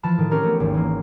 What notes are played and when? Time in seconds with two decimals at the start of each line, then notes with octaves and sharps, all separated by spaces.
0.03 E3 F3 A5 B5 F#6
0.18 A2 D#3
0.31 C4 C#4 G4 A#4 C#5 A#5
0.43 A3 B3
0.60 G#1 D#2
0.74 E3 A#3